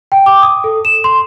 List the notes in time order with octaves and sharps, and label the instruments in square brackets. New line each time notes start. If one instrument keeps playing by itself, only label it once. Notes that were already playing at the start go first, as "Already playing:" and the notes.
[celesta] G5
D6
D#6
A4
E7
C6